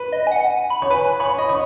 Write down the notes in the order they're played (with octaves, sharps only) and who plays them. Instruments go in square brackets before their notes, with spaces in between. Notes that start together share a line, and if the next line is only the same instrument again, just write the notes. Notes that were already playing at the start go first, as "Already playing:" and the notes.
Already playing: [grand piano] B4
[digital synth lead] D#5
G#5
F#5
G#5
B5
[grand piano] C#5
[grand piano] B4 [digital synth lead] G#5
[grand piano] C#5 [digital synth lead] B5
[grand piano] D#5
C#5